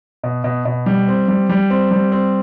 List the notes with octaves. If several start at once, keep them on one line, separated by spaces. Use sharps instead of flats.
B2
B2
B2
G3
C4
G3
G3
C4
G3
C4